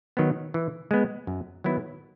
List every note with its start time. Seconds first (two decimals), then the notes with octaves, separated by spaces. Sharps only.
0.17 D#3 F#3 B3
0.54 E3
0.91 G#3 B3
1.27 F#2
1.64 D#3 F#3 B3 E4